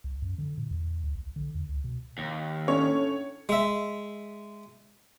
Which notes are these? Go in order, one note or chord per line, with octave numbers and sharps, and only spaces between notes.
C2
F#2
D3
A#2
E2
D2
B1
D3
E2
C#2
B2
D#2
A2 C#4 D4 C#5
G#3 E5